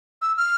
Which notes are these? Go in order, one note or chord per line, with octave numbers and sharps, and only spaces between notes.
E6
F6